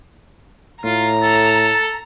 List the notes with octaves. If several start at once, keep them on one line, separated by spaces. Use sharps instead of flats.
A2 F4 A#5
A4